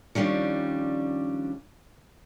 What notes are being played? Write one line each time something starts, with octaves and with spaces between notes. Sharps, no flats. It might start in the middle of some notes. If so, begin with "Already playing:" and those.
D#3 F3 G3 C#4 D4